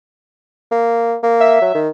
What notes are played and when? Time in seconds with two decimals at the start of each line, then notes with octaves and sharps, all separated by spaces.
0.71 A#3
1.23 A#3
1.40 E5
1.62 F#3
1.75 D#3